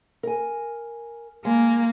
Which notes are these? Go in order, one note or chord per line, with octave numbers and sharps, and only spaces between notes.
A#4 G#5
G#3 A#3